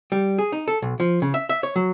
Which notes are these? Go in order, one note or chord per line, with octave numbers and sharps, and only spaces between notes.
G3
G#4
D#4
A4
B1
F3
C#3
E5
E5
C#5
F#3